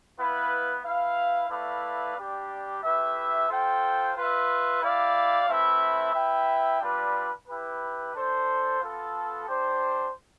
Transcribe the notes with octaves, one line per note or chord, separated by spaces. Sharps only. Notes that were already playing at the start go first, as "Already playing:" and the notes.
B3 E4 B4 F5
E4 B4 F5
A3 E4 B4 D5 F5
G3 D4 G4
A3 E4 G4 B4 E5
F4 A4 C5 G5
F4 B4 E5
E4 G4 D5 F5
A3 C4 E4 B4 E5
E4 B4 E5 G5
G3 D4 F4 B4
E4 G4 B4
D4 A4 C5
B3 F4 A4
D4 G4 C5